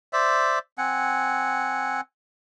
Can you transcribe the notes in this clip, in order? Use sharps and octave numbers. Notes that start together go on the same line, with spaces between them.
C5 D5 E5
C4 F#5 G#5